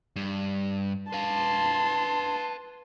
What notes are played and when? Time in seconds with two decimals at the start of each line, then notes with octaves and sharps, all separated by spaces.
0.16 G2
1.13 B4 F5 A5 C6